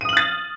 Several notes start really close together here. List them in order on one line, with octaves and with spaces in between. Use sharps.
D#7 D#6 F#7 F6 A6